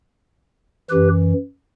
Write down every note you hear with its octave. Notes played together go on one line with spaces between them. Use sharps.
F#2 E3 G4 B4